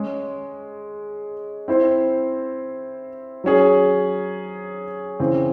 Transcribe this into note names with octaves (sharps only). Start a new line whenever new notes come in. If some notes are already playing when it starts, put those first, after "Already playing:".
Already playing: G#3 C#4 G#4
C4 E4 C5
F#3 C#4 G#4
C#3 E3 C4